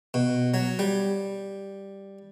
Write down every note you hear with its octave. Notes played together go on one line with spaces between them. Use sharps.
B2
F#3
G3